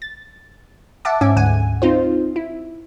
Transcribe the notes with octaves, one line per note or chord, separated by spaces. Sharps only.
A6
E5 F#5 A5 D6
G#2 C#4 E5 G#5 D6
D2 G#2 F#5 G#5 D#7
C4 D#4 F4 C5
E4